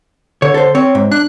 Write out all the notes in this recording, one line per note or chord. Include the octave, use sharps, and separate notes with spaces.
D3 C#5
A4 C5
C4 C#5
G#2
D4 F#6